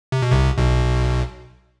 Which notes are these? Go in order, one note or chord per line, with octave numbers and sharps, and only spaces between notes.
C3
B2
C2 C3
B1 B2